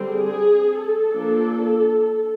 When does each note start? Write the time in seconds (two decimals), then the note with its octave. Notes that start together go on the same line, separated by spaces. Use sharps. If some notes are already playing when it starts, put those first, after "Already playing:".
Already playing: D3 G3 C4
0.12 G#4
0.80 A4
1.15 F3 A#3 D4